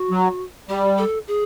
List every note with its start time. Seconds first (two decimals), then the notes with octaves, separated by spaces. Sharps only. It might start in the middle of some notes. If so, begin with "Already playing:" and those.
Already playing: F#4
0.11 F#3
0.69 G3 G4
0.98 A4
1.28 G#4